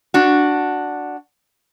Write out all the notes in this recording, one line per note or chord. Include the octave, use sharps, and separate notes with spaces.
D4 F#4